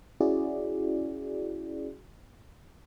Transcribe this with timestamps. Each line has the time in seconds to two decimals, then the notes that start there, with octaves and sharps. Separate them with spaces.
0.20 C#4 E4 F#4 G#4 D5